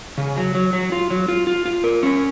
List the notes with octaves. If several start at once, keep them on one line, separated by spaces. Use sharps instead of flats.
C#3
F#3
F#3
F#3
F4
F#3
F4
F4
F4
A#4
C#4